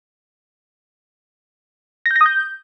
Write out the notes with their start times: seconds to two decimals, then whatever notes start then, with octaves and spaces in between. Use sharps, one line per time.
2.06 A#6
2.11 G6
2.16 A#6
2.21 D#6
2.26 G6